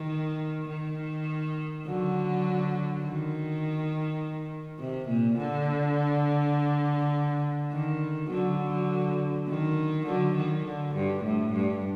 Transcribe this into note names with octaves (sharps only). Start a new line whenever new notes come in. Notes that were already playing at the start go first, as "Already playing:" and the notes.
Already playing: D#3
D#3
D3 F#3
D#3
C3
A#2
D3
D#3
D3 F#3
D#3
D3 F#3
D#3
D3
G2
A2
G2